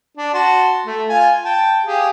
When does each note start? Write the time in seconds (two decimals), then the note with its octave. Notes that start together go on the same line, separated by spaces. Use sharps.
0.17 D4
0.34 F#4 A5 C6
0.86 A3
1.09 F4 F5 G#5
1.45 G5 A5
1.85 G4 G#4 F5